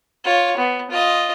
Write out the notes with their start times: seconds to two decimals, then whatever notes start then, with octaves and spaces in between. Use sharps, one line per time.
0.24 F4 C#5
0.57 B3
0.90 F4 D#5